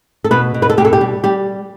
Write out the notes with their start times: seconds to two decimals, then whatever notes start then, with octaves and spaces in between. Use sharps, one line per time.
0.24 A4
0.31 B2 B4
0.54 B2
0.62 B4
0.70 A4
0.77 B2 G4
0.85 A4
0.93 G4
1.01 G3
1.24 G3 G4